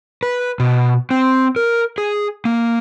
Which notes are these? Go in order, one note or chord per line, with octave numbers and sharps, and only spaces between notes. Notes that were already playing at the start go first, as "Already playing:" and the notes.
B4
B2
C4
A#4
G#4
A#3